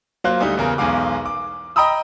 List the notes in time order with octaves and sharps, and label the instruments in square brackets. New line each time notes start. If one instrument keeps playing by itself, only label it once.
[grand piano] F#3 A#3 F4 C5 F#6
D2 G3 D#4
E2 C#3 A#4
B1 E2 G#3 F5 D6
D6
D#5 G5 A#5 B5 D#6 E6